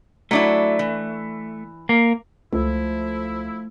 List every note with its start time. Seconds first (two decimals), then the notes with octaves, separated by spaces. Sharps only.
0.31 F#3 A3 D4 E4
0.79 E3
1.89 A#3
2.53 C#2 F3 A3 E4